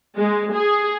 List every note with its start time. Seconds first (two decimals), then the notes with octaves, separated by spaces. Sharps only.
0.16 G#3
0.53 G#4